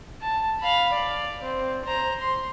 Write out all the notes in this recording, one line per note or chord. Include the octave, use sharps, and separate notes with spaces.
A5
F5 B5
D5
C4
C5 A#5
C6